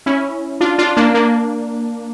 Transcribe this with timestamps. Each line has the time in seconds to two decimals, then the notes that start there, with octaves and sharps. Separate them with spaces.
0.06 C#4 E4
0.60 D4 F4
0.78 D4 F4
0.96 A#3 D4
1.14 A#3 D4